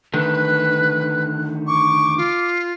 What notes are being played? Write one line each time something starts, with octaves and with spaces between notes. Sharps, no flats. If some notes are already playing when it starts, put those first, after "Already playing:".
D3 D#3 A3 B4 F#6
C#6 D6
F4